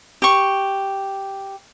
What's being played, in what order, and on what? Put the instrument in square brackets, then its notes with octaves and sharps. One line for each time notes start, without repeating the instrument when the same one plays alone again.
[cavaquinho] G4 C#6